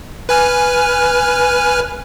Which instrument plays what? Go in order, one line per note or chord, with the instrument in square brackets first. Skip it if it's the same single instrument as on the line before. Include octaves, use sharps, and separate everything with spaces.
[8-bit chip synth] B4 G#5 F6